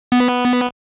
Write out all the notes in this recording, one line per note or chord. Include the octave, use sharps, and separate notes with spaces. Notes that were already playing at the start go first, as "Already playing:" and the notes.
B3